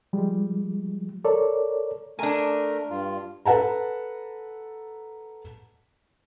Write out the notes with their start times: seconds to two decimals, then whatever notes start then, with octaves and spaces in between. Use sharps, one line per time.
0.13 F3 G3 G#3
1.25 A4 A#4 C#5 D5
2.19 A3 D4 A#4 G#5
2.90 G2 F4
3.46 A4 B4 F#5 A5 A#5